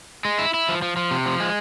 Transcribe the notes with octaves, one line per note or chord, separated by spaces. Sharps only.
G#3
E4
E4
F3
F3
F3
C3
F3
G#3